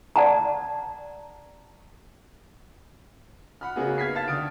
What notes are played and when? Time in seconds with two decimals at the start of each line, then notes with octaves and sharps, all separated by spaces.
0.16 D5 F#5 A5 A#5
3.61 F#5 B5 F6
3.76 C#3 A#3 B3 D#4 F#4 G#4
3.98 F6 G#6 B6 C7
4.15 F5 A5 F6 A6
4.28 D3 D#3 D#6 F6 D7